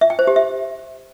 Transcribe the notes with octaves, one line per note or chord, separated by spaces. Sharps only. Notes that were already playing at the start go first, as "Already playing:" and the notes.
E5
G5
C5
G4
E5